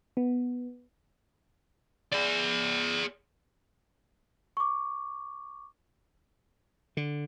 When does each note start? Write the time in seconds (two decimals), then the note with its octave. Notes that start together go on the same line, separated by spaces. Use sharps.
0.17 B3
2.13 G#4 D5
4.57 C#6 D6
6.97 D3